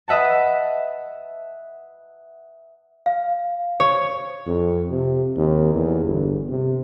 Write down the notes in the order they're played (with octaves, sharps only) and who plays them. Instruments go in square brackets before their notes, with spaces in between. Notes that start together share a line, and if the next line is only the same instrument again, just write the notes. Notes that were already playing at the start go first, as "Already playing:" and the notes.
[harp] B4 D#5 E5 F#5 A5
[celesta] F5
[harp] C#5
[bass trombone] F2
C3
D#2
E2
G1
C3